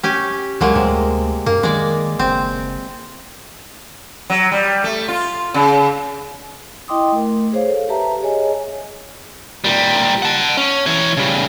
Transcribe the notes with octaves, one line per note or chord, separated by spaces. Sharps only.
C#4 G4 G#5
C2 F#3 G#3 A#3
D2 C3
F#2 A#3
D#3 G#3 D5
F#1 C4
F#3
G3
A3
F4
C#3
E4 D#5 G5 C6 D6 D#6
A3 A#4
G#4 C5 C#5 F5
A4
G4 B4 E5 A5 A#5
G#4 C#5 D#5 G#5
A#2 G3
F#5 A5
C#4
E3 C#5
C#3 G3